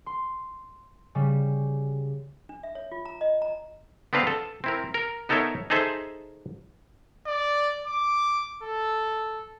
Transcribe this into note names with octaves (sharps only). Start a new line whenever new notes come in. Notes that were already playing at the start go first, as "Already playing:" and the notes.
C6
C#3 G3
D4
E5
C#5
F4
A#5
D#5
A#5
B3 C4 D4 B4 F5
A4
C4 E4 A#4
A#4
B3 D#4 A4 A#4 C#5 E5
D#4 G#4 A4 C5 E5
D5
D6
A4